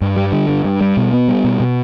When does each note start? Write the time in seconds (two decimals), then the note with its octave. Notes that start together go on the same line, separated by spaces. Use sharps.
0.01 G2
0.16 G3
0.32 D3
0.49 G2
0.64 G2
0.81 G3
0.97 B2
1.13 B3
1.28 G3
1.44 B2
1.60 B2